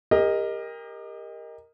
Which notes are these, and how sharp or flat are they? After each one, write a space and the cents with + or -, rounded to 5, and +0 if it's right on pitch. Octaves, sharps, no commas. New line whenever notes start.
G4 +35 A#4 +0 D#5 +0